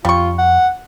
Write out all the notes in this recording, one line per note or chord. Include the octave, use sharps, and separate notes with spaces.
F2 G3 F4 C#6
F#5